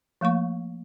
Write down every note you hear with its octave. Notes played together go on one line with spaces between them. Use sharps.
F3 A3 A#3 C#6